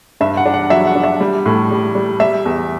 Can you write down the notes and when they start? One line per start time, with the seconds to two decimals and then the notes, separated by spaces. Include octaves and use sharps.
0.21 G2 E5
0.37 F#5
0.46 D4
0.54 F#5
0.70 F#3 E5
0.87 F#5
0.95 D4
1.04 E5
1.21 G3
1.46 A2
1.71 G3
1.95 G3
2.20 G3 E5
2.45 E2